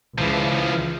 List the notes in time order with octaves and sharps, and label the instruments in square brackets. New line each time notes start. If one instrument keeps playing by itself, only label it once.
[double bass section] C#2 [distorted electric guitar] E3 F3